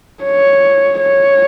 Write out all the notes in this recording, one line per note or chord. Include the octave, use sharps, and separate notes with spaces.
C#5
C#5